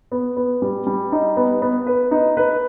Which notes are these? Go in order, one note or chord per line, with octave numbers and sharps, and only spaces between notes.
B3
B3
G3
G3
D#4
B3
B3
B4
D#4
B4